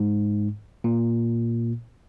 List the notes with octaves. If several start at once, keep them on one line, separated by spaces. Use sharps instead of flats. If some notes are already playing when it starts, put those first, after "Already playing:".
Already playing: G#2
A#2